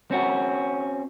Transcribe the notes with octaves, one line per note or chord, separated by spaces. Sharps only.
C4 C#4 F#4